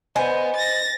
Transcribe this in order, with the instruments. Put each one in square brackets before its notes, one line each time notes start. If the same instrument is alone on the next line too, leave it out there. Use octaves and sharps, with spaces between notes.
[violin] B3 [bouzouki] C5 D#5 G#5
[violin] A6 A#6